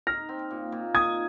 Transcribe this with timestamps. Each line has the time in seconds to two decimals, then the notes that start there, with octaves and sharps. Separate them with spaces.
0.07 D#4 F6 A#6
0.29 C4
0.51 A#2
0.72 A#2
0.95 D#3 D#6 G#6